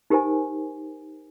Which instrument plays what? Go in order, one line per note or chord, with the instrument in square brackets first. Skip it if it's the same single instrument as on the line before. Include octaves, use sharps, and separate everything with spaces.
[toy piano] D#4 G4 A#4 C5 G#5